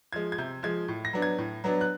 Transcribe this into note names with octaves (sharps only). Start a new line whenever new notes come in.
F3 G#3 G#6
G#6
C3 G6
F3 G#3 G#6
A2
A#6
F#3 B3 D4
G#6
A2
F#3 B3 D4
F#6